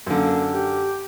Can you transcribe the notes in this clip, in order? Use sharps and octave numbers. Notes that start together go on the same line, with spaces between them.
F#2 D3 A#3
G4